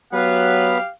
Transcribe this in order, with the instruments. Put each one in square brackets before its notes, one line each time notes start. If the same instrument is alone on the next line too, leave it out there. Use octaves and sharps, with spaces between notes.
[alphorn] F#3 [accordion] B3 B4 [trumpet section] G4 F5